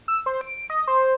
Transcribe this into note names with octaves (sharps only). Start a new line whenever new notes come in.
E6
C5
D7
D#5
C5